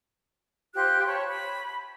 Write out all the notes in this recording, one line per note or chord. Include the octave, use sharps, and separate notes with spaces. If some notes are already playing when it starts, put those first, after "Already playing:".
F4 G4 C5 F#6
C#5 A5 B5
B5